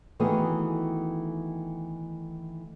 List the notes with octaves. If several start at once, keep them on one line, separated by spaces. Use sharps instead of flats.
D#3 E3 A3 B3 F#4 G#4